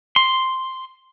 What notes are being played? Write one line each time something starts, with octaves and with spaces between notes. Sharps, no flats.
C6